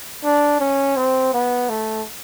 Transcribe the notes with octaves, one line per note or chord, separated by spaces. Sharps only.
D4
C#4
C4
B3
A3